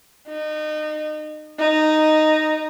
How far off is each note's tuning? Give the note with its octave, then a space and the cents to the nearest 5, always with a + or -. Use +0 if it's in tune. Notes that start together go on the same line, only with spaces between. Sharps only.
D#4 -30
D#4 -5